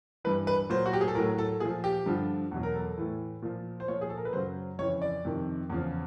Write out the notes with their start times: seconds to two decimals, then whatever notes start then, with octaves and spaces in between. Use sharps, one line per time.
0.25 G2 E3 B4
0.47 B4
0.69 A#2 F#3 C5
0.86 F#4
0.93 G4
1.01 G#4
1.08 A4
1.15 A2 A#4
1.18 F#3
1.38 A4
1.60 A#2 F3 G#4
1.84 G4
2.06 G2 D3 F3
2.51 E2 B2 F#3
2.63 A#4
2.74 A4
2.98 A2 E3
3.42 A#2 F3
3.80 C5
3.88 A#2 F3 C#5
4.01 G#4
4.09 A4
4.17 A#4
4.25 B4
4.33 F#2 C#3 F#3 C5
4.79 F2 C#3 E3 C#5
5.02 D5
5.25 F2 C3 D#3
5.70 E2 C#3 F3